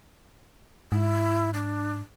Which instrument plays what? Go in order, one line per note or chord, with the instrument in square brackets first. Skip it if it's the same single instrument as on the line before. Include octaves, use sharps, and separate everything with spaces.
[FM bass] G#2 [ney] E4
[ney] D4